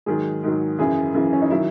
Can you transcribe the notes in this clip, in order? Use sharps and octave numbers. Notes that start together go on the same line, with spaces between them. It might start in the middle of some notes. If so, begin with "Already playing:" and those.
G#2 D#3 F#3 G#4
G#2 D#3 F#3
F#2 C#3 E3 G#4
F#2 C#3 E3
C#4
D#4
D#3 F#3 E4